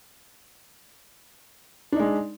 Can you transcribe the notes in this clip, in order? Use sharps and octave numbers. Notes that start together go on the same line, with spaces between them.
G#3 D4 D#4